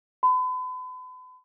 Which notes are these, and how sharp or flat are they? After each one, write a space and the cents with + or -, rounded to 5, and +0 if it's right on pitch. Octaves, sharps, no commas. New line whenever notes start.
B5 +40